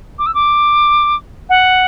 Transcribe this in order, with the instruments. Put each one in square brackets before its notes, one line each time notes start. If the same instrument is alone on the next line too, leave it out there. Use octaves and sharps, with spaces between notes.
[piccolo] D6
E6
D6
F#5